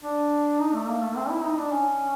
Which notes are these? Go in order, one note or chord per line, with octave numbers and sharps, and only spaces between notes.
D4
D#4
A3
A#3
A3
C4
E4
D#4
D4
C#4